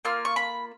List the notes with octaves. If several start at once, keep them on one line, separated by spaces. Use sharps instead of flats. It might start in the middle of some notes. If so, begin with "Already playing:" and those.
A#3 F4 F6
C#6
B5